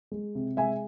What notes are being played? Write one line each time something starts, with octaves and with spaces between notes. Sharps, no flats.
G#3
C3
G#3 E5 G#5